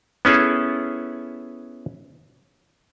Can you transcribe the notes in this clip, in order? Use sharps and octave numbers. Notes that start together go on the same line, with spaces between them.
B3 C#4 E4 G#4 A4